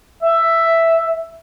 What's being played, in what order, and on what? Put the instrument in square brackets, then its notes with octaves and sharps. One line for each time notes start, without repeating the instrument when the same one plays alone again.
[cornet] E5